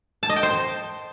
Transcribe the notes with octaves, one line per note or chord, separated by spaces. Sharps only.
A5
D#5
G5
C5